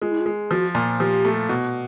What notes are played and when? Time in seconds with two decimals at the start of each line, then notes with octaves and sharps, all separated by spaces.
0.02 G#3 F4
0.11 E4
0.20 F4
0.26 G#3
0.51 F3 F#4
0.75 A#2
1.00 F3 G4
1.25 A3
1.49 B2